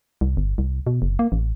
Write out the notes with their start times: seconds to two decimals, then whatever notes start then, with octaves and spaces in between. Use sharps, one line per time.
0.21 C2
0.37 G1
0.58 C2
0.87 B2
1.02 F#1
1.19 A#3
1.32 A1